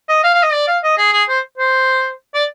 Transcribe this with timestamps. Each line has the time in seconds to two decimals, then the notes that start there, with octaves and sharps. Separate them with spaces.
0.09 D#5
0.23 F5
0.34 F5
0.43 D#5
0.53 D5
0.68 F5
0.84 D#5
0.98 G#4
1.13 G#4
1.29 C5
1.58 C5
2.34 D5